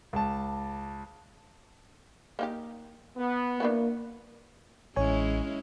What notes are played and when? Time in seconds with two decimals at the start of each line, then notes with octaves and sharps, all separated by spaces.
0.13 C#2 A5
2.39 A#3 D#4 G4
3.17 B3
3.60 A#3 D4 E4 F#4
4.96 A1 G#3 C#4 E4 C#5 G#5